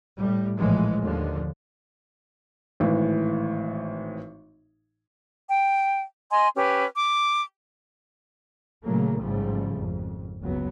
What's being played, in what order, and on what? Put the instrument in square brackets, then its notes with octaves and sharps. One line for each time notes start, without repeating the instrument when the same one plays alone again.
[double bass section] A2 G3
A#1 A2 E3 F3 G#3
D#2 D3 F3
[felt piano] G#1 A2 E3
[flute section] G5
D#5 G#5 C6
C#4 G4 B4
D6
[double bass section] A#2 C#3 E3 F#3 A3 A#3
A1 G#2 C#3 F3 G3 A3
G#1 F2
F#1 C#2 F#3 B3